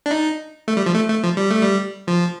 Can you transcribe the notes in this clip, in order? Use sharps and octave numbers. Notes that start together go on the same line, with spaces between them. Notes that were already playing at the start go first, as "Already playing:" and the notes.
D4
D#4
A3
G3
F3
A3
A3
F3
G3
A3
G3
F3